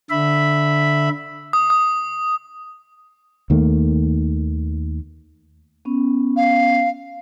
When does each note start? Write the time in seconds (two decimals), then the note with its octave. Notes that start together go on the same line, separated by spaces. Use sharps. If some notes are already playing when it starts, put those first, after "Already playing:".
0.10 D3 E5 B5
1.53 D#6
1.70 D#6
3.50 D#2 D#3 A3 A#3
5.85 B3 C#4
6.36 F5